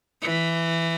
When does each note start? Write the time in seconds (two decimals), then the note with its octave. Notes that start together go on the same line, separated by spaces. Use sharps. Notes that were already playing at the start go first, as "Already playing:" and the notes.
0.22 E3